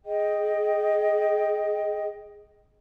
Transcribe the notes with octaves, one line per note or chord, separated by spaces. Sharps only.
G#4 D#5 G5